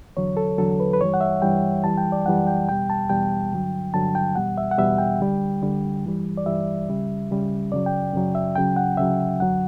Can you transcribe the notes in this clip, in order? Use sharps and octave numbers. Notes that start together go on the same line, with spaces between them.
E2 D3 F#3 C#5
A4
E2 D3 F#3 A4
B4
B4
G2 E3 G3 C#5
F#5
E5
G2 E3 G3 G5
F#2 E3 G3 A5
G5
D5
F#2 E3 G3 F#5
G5
E2 B2 G3 G5
A5
E2 B2 G3 G5
G2 D3 F#3
G2 D3 F#3 A5
G5
E2 B2 G3 F#5
E5
F#5
E2 B2 G3 E5
G5
D2 D3 G3
D2 D3 G3
G2 E3 G3
D5
G2 E3 G3 E5
C#2 C#3 G3
C#2 C#3 G3
F#2 C#3 F#3 D5
G5
F#2 C#3 F#3
E5
D2 C#3 F#3 G5
F#5
D2 C#3 F#3 E5
F#2 D3 F#3 F#5